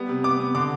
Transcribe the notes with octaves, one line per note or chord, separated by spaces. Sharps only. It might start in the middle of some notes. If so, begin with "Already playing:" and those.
Already playing: G3 B3
C3
B3 D6
B3
D3 D6